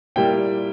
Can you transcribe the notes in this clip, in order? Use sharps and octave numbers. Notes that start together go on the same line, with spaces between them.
A#2 G3 A#3 E4 G5